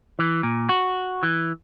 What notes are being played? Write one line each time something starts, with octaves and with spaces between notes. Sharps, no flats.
E3
A#2
F#4
E3